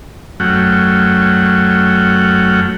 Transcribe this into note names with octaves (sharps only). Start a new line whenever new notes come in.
F#2 F#3 A3 C#4 F#5 G5